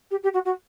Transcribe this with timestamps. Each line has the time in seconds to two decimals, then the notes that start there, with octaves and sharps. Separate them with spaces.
0.11 G4
0.23 G4
0.33 F#4
0.45 F#4